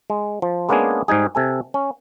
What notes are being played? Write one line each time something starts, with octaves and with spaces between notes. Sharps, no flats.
G#3
F3
G#3 A#3 B3 C#4 D4 G#4
G#2 G3 D#4 G#4
C3 A4 G#5
C#4